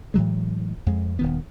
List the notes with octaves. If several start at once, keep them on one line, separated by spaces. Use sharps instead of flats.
A2 E3 F#3 G#3
F2 G#3
D#1 D#3 B3